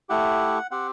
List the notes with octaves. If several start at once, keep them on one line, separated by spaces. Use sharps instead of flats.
A3 E4 G4 F#5
C4 G4 F#5